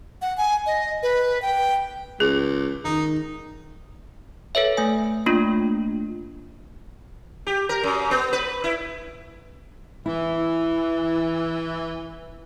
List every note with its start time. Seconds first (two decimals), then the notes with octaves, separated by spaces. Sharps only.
0.22 F#5
0.37 G#5
0.66 D#5
1.03 B4
1.42 G5
2.20 C#2 G#4
2.85 D#3 D#4
4.55 A4 B4 C#5 E5
4.77 A3 G#5
5.26 A3 A#3 D4 F4
7.47 G4
7.69 A#4
7.83 F#2
8.11 B3
8.33 B4
8.64 E4
10.06 E3 E4